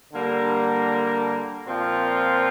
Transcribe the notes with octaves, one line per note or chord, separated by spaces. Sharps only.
D3 G3 A#3
A#2 F3 C4 F4